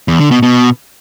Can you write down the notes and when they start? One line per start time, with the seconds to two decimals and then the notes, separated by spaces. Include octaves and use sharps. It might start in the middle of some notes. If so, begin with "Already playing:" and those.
0.08 E2
0.20 D3
0.31 B2
0.43 B2